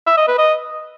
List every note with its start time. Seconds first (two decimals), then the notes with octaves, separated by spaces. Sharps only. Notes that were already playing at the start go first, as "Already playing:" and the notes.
0.07 E5
0.17 D#5
0.28 B4
0.38 D#5